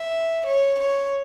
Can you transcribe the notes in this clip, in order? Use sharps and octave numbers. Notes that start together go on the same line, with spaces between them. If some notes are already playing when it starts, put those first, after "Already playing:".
Already playing: E5
C#5
C#5